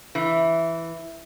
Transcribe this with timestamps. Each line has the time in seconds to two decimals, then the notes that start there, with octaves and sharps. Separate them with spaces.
0.15 E3